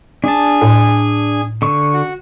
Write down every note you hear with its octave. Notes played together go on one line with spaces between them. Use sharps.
D4 G#4 G#5 A5
A2
D3 C#6
F#4